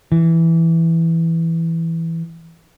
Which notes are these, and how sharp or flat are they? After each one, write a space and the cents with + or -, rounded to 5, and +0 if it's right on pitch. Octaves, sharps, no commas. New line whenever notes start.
E3 +0